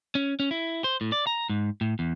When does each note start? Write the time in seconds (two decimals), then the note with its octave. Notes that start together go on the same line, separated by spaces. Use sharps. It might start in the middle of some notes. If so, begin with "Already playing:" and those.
0.15 C#4
0.40 C#4
0.51 E4
0.84 C5
1.01 A2
1.12 D5
1.27 A#5
1.50 G#2
1.81 A2
1.99 E2